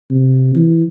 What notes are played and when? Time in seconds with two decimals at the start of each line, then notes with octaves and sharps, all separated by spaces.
0.10 C3
0.56 E3